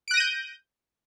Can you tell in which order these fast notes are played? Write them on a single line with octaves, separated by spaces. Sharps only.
D7 F#6 A#6 D#7 G6